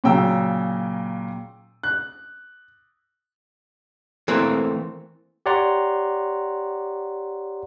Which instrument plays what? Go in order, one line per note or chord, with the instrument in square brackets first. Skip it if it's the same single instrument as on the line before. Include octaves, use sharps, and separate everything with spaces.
[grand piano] A#2 C#3 F#3 G5 A#5 E6
F#6
[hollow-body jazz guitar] E3 A3 A#3 C4
[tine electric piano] G4 C#5 D5 F#5 A#5 C6